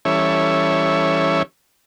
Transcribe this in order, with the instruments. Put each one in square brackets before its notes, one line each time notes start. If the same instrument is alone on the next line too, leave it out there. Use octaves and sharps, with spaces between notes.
[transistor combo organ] E3 G3 C#4 A4 C#5 E5